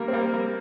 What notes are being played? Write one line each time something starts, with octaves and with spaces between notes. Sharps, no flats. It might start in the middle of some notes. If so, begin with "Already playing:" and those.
Already playing: G3 A#3
C4
G3 A#3
G3 A#3